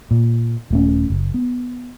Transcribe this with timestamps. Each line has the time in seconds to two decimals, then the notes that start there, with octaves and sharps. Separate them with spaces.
0.11 A#2
0.70 D#1 A3 C#4
1.10 F#1
1.34 B3